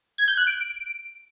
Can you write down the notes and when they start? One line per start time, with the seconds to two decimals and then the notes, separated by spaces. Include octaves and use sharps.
0.18 G#6
0.28 G6
0.37 F#6
0.47 D7